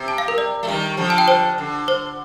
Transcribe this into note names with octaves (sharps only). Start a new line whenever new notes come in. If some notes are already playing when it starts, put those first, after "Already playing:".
Already playing: C3
A5
F5
A#4
D5
A3
D#3 G3
D3 F3
A5
G5
C5
D3
C5